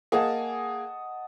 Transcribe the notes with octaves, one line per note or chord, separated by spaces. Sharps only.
A#3 G#4 D#5 F#5 A5